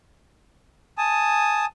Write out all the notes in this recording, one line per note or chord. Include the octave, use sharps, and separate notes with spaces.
G#5 A5 D#6